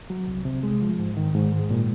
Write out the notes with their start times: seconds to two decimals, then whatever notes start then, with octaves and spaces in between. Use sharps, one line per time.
0.10 F#3
0.28 C2
0.45 C3
0.63 G#3
0.82 F3
0.99 G#2
1.17 D#3
1.35 G#2
1.52 G#3
1.70 A#2